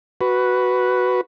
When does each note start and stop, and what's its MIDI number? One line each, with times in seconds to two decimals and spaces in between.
0.21 1.21 66
0.21 1.21 71